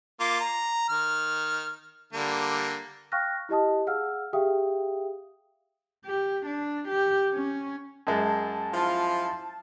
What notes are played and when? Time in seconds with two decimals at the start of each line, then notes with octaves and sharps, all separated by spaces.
0.20 A#3 F4 D6
0.40 A#5
0.89 D#3 F6
2.13 D3 G3 A#3
3.12 F5 G5 C#6 F6 F#6 A#6
3.49 E4 G4 D#5 A5 D#6
3.87 G#4 F5 F#5 E6 F6
4.33 G4 G#4 E5 F5 G5 D#6
6.05 G4
6.46 D4
6.88 G4
7.33 C#4
8.07 F#2 G#3 A5
8.72 F3 E4 F4